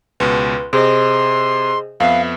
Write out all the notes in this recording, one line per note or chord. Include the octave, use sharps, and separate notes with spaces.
C#2 B2 B4 C6
C3 G#4 C5 D#5 C6
F2 B3 E5 F5